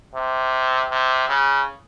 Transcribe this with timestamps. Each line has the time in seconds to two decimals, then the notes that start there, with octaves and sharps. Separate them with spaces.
0.14 C3
0.91 C3
1.29 C#3